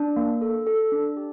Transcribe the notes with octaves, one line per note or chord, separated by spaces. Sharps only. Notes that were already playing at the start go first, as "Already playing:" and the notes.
Already playing: D4
A#3
A4
A4
D4
G4